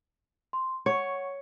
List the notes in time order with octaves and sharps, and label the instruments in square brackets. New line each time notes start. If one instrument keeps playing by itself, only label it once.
[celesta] C6
[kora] C#5 [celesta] F#5 C#6